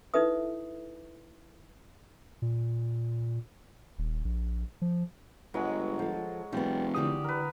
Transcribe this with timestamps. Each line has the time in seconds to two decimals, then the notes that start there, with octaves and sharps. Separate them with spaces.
0.14 D#4 E4 A4 B4 E5 D#6
2.42 A#2
3.98 D#1
4.25 A#1
4.82 F3
5.54 G1 F#3 G#3 B4
5.99 F3 A4
6.52 F1 G3 B3
6.95 D3 E3 G4 D5 D#6
7.24 A#4 B4